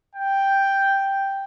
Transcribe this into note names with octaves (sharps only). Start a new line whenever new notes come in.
G5